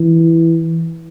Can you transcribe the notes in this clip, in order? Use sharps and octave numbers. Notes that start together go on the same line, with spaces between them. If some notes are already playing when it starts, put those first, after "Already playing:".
Already playing: E3